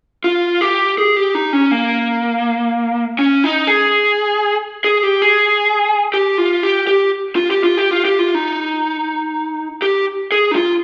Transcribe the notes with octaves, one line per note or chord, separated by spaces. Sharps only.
F4
G4
G#4
G4
D#4
C#4
A#3
C#4
D#4
G#4
G#4
G4
G#4
G4
F4
G4
G4
F4
G4
F4
G4
F4
G4
F4
D#4
G4
G#4
D#4
F4